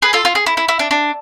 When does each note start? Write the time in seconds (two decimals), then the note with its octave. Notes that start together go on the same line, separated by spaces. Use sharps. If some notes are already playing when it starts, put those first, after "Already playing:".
0.02 G#4 B4
0.13 F4 A4
0.25 F4
0.35 G#4
0.46 E4
0.57 E4
0.68 E4
0.79 D4
0.91 D4